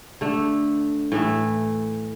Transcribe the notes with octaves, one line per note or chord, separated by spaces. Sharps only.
D3 A3
A2 E3 A3